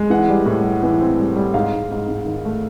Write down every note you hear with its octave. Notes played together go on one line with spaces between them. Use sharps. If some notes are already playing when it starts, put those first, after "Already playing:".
Already playing: G#3
E3 F#5
G3
A2
G3
E3
C4
G3
G3
G#2 F5
G#2
G#2
G#2
D#3
A3